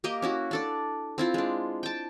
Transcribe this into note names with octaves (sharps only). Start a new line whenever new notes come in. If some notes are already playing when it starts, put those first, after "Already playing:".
A#3 G4 A#4 D#5
C#4 E4 F#4
D4 A4 D5
C4 E4 F4
G#3 D4
G5 A5